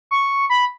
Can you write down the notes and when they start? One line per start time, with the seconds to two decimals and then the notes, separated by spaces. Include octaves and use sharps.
0.11 C#6
0.50 B5